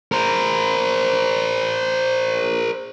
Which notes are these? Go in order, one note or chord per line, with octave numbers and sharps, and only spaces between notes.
A#4 C5